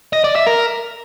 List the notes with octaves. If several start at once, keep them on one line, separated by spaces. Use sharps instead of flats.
D#5
D5
E5
A#4